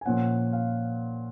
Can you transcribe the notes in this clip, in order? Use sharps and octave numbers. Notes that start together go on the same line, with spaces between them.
G#5
A#2 F3 A#3 C#4 F#5
F5